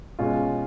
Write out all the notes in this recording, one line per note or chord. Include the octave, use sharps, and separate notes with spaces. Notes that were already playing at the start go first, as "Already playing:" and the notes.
B2 G#3 C#4 F4